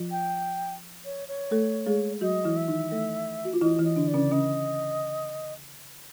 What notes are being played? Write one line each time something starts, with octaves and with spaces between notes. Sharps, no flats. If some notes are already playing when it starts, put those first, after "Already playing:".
Already playing: F3 F4
G5
C#5
C#5
A3 A4
G#3 G#4
F#3 F#4 D#5
E3 E4
E5
D#3 D#4
A3 A4
F#4
F4
E3 E4 D#5
E3 E4
D#5
D3 D4
D5
C#3 C#4
C#3 C#4 D#5